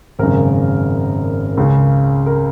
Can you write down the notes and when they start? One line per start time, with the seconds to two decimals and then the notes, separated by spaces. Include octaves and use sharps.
0.19 G#1 F#2 C#3 A#4
1.57 C#2 C#3
2.26 A#4